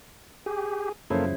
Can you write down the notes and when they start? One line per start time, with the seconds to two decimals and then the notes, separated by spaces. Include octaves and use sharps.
0.46 G4 G#4
1.10 F#2 C#3 F3 A#3 E4 F4 A4